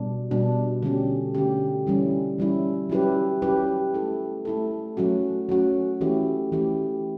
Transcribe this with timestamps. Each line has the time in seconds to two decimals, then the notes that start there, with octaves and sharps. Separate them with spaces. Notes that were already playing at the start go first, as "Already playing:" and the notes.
Already playing: B2 G3 B3 D4
0.31 B2 G3 B3 D4
0.83 D3 A3 C#4 G4
1.35 D3 A3 C#4 G4
1.87 E3 G3 C#4 E4
2.38 E3 G3 C#4 E4
2.90 F#3 C#4 E4 G4 B4
3.42 F#3 C#4 E4 G4 B4
3.94 A3 E4 A4
4.45 A3 E4 A4
4.97 F#3 A3 C#4 F#4
5.49 F#3 A3 C#4 F#4
6.01 E3 A3 C#4 E4 G4
6.52 E3 A3 C#4 E4 G4